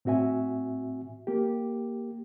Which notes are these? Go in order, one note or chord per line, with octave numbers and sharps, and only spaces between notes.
A2 C4 F#4 E5 G#5
A#3 G4